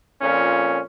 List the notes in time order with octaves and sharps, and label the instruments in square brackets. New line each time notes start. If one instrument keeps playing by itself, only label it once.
[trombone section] F2 A#2 C#4